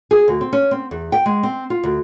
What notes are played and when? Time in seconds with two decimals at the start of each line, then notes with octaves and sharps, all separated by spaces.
0.11 G#4
0.28 D2
0.41 C4
0.53 C#4
0.71 C4
0.91 E2
1.12 G5
1.26 G#3
1.43 C4
1.70 F4
1.83 D2